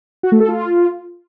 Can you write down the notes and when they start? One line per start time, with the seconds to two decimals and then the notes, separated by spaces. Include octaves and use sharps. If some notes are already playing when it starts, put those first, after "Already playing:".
0.23 F#4
0.32 A3
0.40 A4
0.49 F4